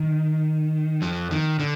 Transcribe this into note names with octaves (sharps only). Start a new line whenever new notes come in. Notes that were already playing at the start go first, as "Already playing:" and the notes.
Already playing: D#3
F2 F3
D#3
D3